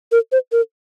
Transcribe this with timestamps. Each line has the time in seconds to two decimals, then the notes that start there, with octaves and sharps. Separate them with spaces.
0.12 A#4
0.32 C5
0.52 A#4